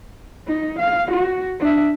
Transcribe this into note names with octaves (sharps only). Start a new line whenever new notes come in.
D#4
F5
F#4
D4 E5